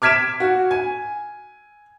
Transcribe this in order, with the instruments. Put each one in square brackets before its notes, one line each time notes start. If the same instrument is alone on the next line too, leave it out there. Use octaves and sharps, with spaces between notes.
[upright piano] D6 F6 G#6 B6 D7 E7
F#4
G#5